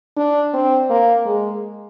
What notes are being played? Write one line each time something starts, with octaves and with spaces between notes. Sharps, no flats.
D4
C4
A#3
G#3